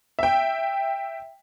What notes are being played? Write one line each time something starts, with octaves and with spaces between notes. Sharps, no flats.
E5 G5